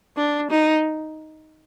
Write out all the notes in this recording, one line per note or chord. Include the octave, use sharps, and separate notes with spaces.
D4
D#4